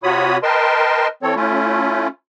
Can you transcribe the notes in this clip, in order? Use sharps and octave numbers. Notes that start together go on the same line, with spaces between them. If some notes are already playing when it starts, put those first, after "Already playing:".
C3 F4 F#4 C#5 B5 D#6
A#4 B4 D#5 G5 A5 C6
E3 C4 A4 C#5
A3 C#4 E4 F4